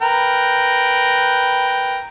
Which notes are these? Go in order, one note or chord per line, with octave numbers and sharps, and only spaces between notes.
A#4 B4 G5